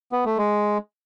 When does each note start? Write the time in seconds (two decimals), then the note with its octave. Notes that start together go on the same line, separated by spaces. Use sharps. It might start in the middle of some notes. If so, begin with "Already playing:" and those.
0.12 B3
0.25 A3
0.37 G#3